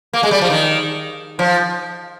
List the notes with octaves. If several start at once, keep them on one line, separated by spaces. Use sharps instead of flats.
A#3
G#3
G3
F3
D#3
F3